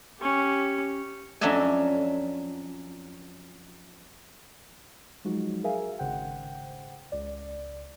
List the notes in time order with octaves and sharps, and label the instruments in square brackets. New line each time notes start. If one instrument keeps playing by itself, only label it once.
[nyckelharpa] C#4 G4
[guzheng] F2 F#3 C#4 D4 E5 G#5
[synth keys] F3 F#3 G#3 D#4 F#4
G#4 A#4 E5 F5 G#5
G#1 C#3 C5 F#5 G5
C#2 D5